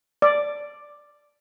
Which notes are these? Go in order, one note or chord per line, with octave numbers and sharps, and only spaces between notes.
D5